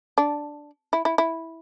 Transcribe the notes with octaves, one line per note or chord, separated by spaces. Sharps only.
D4
E4
E4
E4